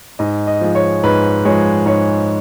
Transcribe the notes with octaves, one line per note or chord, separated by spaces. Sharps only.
G#2 D#5
D#5
F3 G#3
C#5
G#2 B4
F3 G#3 C#5
G#2 C#5